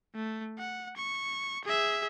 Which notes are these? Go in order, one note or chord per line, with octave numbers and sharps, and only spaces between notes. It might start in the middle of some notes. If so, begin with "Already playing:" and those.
A3
F#5
C#6
G#4 E5